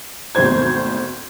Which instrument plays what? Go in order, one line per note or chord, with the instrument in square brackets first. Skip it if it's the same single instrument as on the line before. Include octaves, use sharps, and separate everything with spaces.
[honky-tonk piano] G#1 D2 B2 D#3 C5 G#6